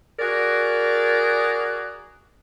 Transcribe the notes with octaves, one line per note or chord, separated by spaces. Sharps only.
F#4 G#4 A#4 D5